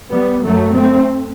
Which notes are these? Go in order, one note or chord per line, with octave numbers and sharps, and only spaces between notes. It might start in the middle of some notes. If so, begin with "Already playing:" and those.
G3 B3
F#2 F#3 A3
A3 C4